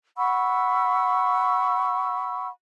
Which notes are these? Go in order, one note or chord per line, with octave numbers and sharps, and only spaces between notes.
F#5 B5 C#6 E6